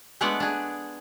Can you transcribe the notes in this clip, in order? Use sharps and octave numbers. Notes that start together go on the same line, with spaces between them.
G#3 A3 B3 D4 D5 F#5
D4 G#4